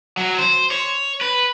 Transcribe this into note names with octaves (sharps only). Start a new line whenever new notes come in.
F#3
C5
C#5
B4